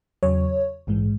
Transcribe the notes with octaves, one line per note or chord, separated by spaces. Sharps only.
E2 C#3 F#3 C#5
A#1 G#2 E3 G#3